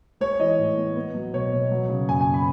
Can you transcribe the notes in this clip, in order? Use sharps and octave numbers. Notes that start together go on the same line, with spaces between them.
G#3 C#5
E3 D#5
A2
B3
B3
F#3
B2 C#5
B2
F#3
C#3
F#2 G#5
G#5
B3
B5